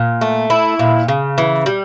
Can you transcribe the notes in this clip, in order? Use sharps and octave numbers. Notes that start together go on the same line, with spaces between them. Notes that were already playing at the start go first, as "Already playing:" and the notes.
Already playing: A#2
A3
E4
A#2
C#3
E3
G3